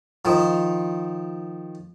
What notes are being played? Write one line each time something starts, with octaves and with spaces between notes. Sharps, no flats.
D#3 F3